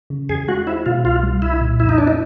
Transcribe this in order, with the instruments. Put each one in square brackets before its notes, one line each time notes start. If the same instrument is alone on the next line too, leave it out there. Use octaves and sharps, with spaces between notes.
[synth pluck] C#3
[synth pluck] E2 [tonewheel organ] G#4
[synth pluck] G#3 [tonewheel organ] F#4
[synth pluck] C4 [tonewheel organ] E4
[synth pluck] B2 [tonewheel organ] F4
[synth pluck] C2 [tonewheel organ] F4
[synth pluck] G3
[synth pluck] C2 [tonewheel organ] E4
[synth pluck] A#2
[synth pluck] F2 [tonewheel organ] E4
[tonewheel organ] D#4
[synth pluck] E3 [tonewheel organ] D4
[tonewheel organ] D#4